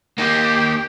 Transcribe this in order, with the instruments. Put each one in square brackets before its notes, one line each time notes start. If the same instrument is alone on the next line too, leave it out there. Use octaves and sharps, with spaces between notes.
[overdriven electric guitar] A#3 D#4 [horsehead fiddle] G4